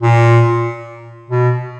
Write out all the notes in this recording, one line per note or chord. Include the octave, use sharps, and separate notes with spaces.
A#2
B2